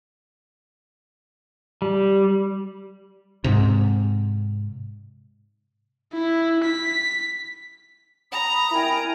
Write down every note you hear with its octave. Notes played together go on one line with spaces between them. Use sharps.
G3
G#2 C3
E4
B6
A#5 B5 D#6
E4 A#4 G5 G#5